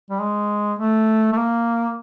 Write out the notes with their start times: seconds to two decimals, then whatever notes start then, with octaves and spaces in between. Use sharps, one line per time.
0.10 G3
0.21 G#3
0.79 A3
1.33 A3
1.37 A#3